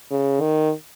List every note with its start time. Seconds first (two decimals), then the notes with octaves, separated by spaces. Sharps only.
0.11 C#3
0.41 D#3